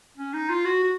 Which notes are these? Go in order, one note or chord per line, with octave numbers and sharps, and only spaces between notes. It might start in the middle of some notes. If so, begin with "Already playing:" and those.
C#4
D#4
F4
F#4
F#4